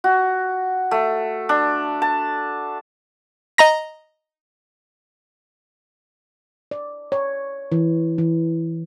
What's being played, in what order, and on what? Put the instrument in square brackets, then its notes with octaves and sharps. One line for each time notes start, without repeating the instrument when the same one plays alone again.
[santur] F#4
A3
D4
A5
[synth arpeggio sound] D#5 A#5 A#6
[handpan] D5
C#5
E3
E3